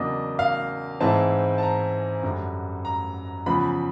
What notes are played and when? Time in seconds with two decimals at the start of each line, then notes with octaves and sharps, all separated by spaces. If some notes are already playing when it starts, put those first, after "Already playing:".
Already playing: E2 C#3 F#3 A#3 D4 D#5
0.39 F5
1.01 G#2 E3 G#3 C4 E4 A5
1.58 A5
1.62 A#5
2.23 F#2 D3 G3
2.85 A#5
3.46 E2 C#3 F3 B5